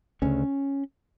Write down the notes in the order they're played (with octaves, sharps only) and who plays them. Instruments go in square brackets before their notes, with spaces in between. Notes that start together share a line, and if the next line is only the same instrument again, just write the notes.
[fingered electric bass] D2 C#3 C#4